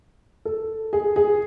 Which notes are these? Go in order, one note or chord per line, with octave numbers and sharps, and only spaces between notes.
A4
G#4
G#4